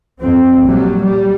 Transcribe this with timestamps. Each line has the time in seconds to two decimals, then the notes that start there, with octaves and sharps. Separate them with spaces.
0.20 F2 C4
0.63 A#1 F#3 G3
1.01 G3